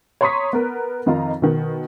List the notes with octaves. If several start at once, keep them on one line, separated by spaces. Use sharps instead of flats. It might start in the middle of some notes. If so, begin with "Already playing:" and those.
C#5 A#5 C6 C#6 D#6 B6
B3 A#4 B4
F2 D#3 D#4 F4 A#5
B2 D#3